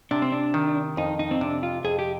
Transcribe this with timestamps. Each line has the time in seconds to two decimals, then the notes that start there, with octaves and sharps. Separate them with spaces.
0.11 C3 D4
0.22 C4
0.32 D4
0.54 D#3
0.97 F2 D#4
1.19 D#4
1.31 C4
1.41 C3 D4
1.63 F4
1.85 F2 G#4
1.99 G4